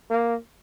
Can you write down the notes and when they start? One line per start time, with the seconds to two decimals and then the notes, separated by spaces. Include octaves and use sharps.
0.10 A#3